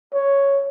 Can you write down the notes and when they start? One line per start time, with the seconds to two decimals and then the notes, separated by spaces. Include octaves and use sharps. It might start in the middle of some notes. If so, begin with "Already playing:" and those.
0.14 C#5